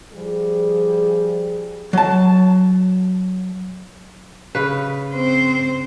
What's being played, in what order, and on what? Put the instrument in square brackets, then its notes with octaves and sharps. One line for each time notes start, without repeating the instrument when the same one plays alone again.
[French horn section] F3 G3 G#4
[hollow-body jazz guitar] F#3 A5
[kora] C#3 B4
[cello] C4 C5